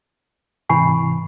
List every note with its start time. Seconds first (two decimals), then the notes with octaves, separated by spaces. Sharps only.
0.69 G#2 C3 E3 G#5 B5 C#6 C7